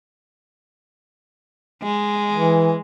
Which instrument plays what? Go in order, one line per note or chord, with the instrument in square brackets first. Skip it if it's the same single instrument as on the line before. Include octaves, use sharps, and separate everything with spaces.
[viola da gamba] G#3
[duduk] E3